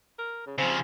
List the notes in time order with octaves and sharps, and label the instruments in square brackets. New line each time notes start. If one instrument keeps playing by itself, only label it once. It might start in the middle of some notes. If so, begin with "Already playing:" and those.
[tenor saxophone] A#4
C#3
[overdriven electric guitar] C#3 F3 [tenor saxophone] C4